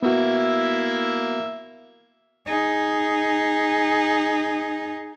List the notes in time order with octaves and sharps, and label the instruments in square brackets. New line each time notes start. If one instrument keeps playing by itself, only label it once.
[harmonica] A#3 E4 E5 [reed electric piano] B3 F#4
[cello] D#4 G#4